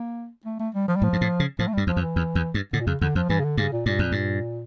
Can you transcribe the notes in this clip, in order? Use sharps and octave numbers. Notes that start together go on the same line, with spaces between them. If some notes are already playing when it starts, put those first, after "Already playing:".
Already playing: A#3
A3
A3
G3
F3
G3
A2 F3
G2
A2
C#3
A2 F3
A3
G2 G3
E2 F3
F2
E3
E2
E2
G2
A2 D3
A#2
F2 C#3
E2 D3
F2 F3
G2 E3
C#3
D3
G2 C#3
A#2
G2 A#2
F2
G2